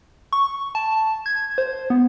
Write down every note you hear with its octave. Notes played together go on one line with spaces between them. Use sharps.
C#6
A5
G#6
C5
B3